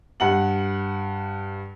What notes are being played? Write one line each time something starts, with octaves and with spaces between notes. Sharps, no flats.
G2 F#5 F#7